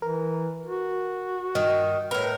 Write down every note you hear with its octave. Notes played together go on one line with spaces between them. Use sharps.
E3 A#4
F#4
G2 D#3
A2 A#4 B4